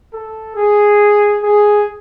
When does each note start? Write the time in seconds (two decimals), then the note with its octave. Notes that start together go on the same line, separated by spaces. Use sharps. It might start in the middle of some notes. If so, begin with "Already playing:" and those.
0.13 A4
0.56 G#4
1.43 G#4